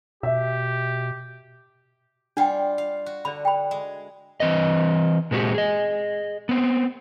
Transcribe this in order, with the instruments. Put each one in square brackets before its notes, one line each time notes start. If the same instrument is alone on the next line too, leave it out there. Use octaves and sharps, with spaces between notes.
[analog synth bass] B2 [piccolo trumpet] G4 [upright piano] E5
[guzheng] G3 F4 [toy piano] D4 F#5 G5
[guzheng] F5
F#4
[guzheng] D3 [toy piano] D5 B5
[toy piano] G5 B5
[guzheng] G#3
[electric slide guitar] E3 C4 B4 D#5
A#2 G#3 C4 F#4 G4
G#4 D#5
B3 C4